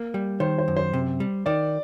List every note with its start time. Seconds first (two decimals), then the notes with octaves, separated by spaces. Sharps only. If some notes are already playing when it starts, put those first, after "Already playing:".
Already playing: A#3
0.14 G3
0.40 D#3 C5
0.58 C5
0.68 F#2
0.77 C5
0.93 C3
1.20 G3
1.46 D#3 D5